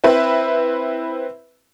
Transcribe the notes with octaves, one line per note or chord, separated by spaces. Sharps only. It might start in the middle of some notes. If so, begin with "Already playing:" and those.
C4 E4 B4